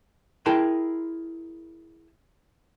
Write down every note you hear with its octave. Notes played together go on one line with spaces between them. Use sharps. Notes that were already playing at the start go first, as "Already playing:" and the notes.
E4 G#4 A#4 G5 A5 C6